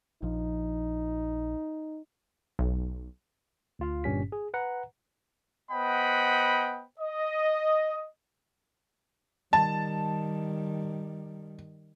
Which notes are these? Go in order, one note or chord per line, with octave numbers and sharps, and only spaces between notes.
A#1 F3 D#4
B1
D2 F4 F5
G1 G2 A#2 C#4 G4 B6
G#4
B4 F#5 A#5
B3 C5 D#5 F#5 G5 B5
D#5
D#3 G3 A5